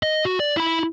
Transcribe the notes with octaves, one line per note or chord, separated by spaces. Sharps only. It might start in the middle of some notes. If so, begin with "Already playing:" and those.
D#5
F#4
D5
E4 B5